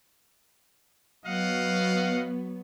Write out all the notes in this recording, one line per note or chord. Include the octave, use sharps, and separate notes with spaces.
F#3 B3 D#5 F5 F#5